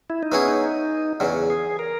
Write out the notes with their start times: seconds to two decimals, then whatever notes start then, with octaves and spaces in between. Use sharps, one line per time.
0.10 E4
0.23 D#4
0.32 F#3 B3 C#4 E4 G#4 C#5
0.48 D#4
1.20 E2 C#3 F#3
1.50 G#4
1.79 A#4